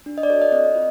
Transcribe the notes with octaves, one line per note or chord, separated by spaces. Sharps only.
D4
D#5
D5
F#4 A4 C#5
D#5
C4 D#5
F4